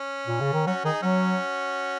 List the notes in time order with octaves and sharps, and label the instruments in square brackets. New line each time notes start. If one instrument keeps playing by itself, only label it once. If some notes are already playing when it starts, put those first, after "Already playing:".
Already playing: [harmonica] C#4
[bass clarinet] A#2
C#3
D#3
[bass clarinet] F#3 [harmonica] C#4 F#4
[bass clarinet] D#3 [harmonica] D#4 G#4
[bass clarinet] F#3 [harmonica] C#4 F#4